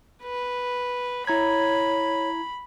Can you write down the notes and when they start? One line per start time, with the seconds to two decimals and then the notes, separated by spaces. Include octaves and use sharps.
0.23 B4
1.27 E4 C#5 A#5 B5 G#6